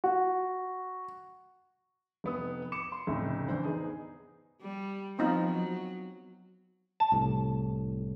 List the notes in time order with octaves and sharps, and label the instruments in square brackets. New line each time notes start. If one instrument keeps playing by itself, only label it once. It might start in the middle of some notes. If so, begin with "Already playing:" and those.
[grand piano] F#4
F1 B3 D#6
D6 C#7 E7
C6
F1 A2 C#3
E2 D3 C5
B3 D#4 G#4
[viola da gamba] G3
[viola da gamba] F3 B3 [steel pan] C4 D#4 F4
[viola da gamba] F#3
[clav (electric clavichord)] A5
[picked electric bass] C2 A2